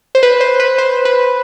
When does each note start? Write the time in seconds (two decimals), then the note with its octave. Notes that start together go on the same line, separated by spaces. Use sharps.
0.15 C5
0.23 B4
0.41 C5
0.60 B4
0.78 C5
1.05 B4